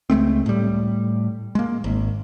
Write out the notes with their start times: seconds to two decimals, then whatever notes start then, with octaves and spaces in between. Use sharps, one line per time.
0.10 C#2 G#3 A3 C4
0.46 A2 G3
1.55 G#3 A#3
1.84 G#1